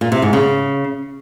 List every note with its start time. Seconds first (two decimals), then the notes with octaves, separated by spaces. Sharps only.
0.01 A#2
0.12 C3
0.22 G#2
0.33 C#3